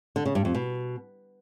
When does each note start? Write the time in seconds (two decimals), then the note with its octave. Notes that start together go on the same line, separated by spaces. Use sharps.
0.16 D3
0.25 C#3
0.35 G2
0.45 F2
0.55 B2